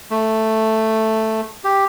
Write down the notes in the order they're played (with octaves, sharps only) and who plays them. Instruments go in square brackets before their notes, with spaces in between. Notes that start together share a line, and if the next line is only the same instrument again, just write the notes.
[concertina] A3
G4